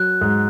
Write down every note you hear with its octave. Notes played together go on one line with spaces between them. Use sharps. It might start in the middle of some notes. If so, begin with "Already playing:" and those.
Already playing: F#3 F#6
G#2